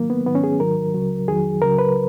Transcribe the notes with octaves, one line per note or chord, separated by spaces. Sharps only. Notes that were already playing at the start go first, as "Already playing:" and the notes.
Already playing: G#2 D#3 F#3 A#3
B3
G#2 D#3 F#3 B3
C#4
G#4
G#2 D#3 F#3 A#4
C#2 C#3 F#3
F2 D#3 F#3 G#4
C#2 C#3 F#3 A#4
B4